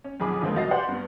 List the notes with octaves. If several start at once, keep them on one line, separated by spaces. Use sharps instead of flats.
C#4
B1 F2 G#4 B5 D6
F2 D3 F3 G#3 A#3 C4
C2 F#4 D#5 A6 C7
G4 C5 D5 F#5
G2 B3